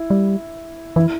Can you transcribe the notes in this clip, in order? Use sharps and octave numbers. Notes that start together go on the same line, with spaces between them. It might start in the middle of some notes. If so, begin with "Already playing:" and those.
Already playing: E4
G3
E3 E4